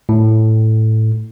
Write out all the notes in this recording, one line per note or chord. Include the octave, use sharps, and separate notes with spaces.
A2